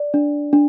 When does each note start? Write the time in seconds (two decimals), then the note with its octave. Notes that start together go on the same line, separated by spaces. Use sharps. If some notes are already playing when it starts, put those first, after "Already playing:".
Already playing: D5
0.14 D4
0.53 D4